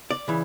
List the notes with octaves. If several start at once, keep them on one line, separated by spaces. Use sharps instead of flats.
D5
C#3 E3